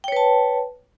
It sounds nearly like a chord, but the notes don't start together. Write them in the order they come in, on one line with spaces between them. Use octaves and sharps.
G5 C#5 B4 A5